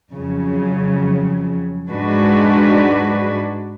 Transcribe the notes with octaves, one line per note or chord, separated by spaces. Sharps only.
F2 C#3 F#3
G#2 G#3 D4 F#4 B4